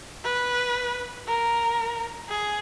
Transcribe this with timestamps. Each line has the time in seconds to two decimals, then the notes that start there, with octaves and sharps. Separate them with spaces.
0.25 B4
1.27 A#4
2.29 G#4